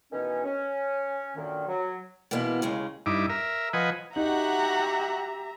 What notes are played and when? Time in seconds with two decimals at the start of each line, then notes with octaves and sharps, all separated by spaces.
0.12 B2 D#3 E3 C#4
0.45 C#4
1.37 F#2 A#2 D3 D#3
1.68 F#3
2.31 B2 E3 G#3 A#3 B3
2.62 D#2 C#3 G#3
3.06 G2 D#4 E4 D6
3.30 A#4 E5
3.73 F3 B4 D#5 F#5 G#5
4.16 D#4 F#4 G4 E5 F#5 A#5